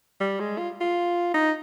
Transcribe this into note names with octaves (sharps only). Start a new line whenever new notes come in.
G3
G#3
F4
F4
D#4